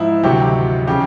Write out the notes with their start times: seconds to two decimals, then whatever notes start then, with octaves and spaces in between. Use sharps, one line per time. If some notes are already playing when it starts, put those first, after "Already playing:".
Already playing: G#2 F3 E4
0.23 D2 C3 D#3 F#3 G4
0.87 C#3 F3 G4